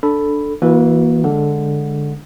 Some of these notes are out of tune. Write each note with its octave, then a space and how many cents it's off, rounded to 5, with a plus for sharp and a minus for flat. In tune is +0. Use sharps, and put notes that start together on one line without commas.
D4 +0 A4 +0 B5 +0
E3 -5 A#3 +30 F#4 -25
D3 +0 G#3 +0 F#5 -15